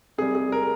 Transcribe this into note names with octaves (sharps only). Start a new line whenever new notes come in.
C3 G3 G#4
G#4
A#4